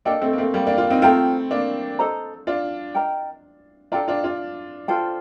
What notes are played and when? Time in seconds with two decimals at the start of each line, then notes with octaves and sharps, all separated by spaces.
0.05 A#3 D4 A4 D#5 G5
0.21 A3 C4
0.33 A#3
0.38 A3 C4
0.54 G3 A#3
0.67 A#3 D4
0.78 D4 F4
0.90 C4 D#4
1.02 A3 C4 F4 C5 G5 A#5
1.51 A#3 D4
1.99 A4 C5 D#5 A#5
2.47 D4 F4
2.95 A#4 D#5 G5 A#5
3.92 D4 F4 A4 D5 G5 A#5
4.08 D4 F4
4.24 D4 F4
4.88 F4 A4 C5 G5